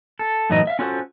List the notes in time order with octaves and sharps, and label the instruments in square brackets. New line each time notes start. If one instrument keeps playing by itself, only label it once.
[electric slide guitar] A4
F#2 A2 E3 F#3 D#4 D#5
E5 F5
C#4 F4 F#4 A4 C5